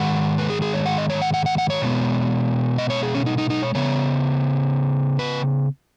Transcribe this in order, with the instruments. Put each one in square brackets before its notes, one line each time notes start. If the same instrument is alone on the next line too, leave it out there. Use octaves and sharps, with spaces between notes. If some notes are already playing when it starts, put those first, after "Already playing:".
Already playing: [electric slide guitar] G#2 D#3 G#3 F#5
B4
G#4
G#4
C#5
F#5
D#5
C#5
F#5
F#5
F#5
F#5
C#5
B2 G#3 B3
D#5
C#5
G#4
C#4
D#4
D#4
D#4
C#5
C#3 B3 C#5
B4